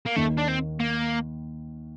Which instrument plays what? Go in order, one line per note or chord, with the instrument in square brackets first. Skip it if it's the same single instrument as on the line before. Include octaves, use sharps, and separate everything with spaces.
[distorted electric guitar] A#3
[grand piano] D#2 D#3 [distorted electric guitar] A3
[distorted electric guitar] D4
C4
A#3